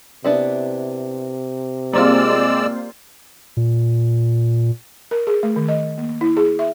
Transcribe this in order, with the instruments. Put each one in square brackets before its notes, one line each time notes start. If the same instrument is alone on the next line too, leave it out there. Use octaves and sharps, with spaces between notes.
[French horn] C3 [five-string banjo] B3 D4 E4
[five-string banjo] G3 [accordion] G#3 D5 E6 [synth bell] A#3 C4 F4
[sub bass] A#2
[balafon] A#4
G#4
A3
D#3
D#5
A#3
E4
G#4
E5